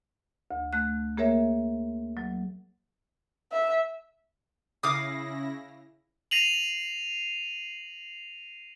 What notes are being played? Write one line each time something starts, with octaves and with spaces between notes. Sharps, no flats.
D2
A3 F#6
A#3 G#4 A#4 C#5 E5
F#3
E5
C#3 E4 F5 D6 D#6 A#6
A#6 C7 D#7 F7 F#7